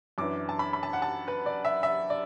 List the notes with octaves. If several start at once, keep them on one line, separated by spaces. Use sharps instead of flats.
F#2 E3 D4 D6
A5
B5
B5
A5
F#5
A5
B4
D5
E5
E5
D5